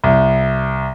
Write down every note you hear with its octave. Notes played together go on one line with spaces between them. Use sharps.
C2